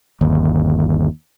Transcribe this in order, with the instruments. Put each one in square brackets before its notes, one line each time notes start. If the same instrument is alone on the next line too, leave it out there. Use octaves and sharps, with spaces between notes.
[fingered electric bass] G1 D#2